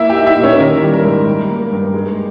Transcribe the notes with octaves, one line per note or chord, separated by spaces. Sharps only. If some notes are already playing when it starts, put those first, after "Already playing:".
Already playing: A#3 E4 E5
G4 G5
D#4
E4 E5
A#2
C#4 C#5
D#3 A#4
G3
A#4
G#2
G3
A#3
G2
G#3